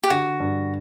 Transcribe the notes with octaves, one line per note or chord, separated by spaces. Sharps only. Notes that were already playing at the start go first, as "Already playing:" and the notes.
G4
D3 F#4
G2